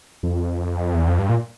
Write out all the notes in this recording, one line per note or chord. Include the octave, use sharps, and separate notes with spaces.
F2
E2
F2
G2
A#2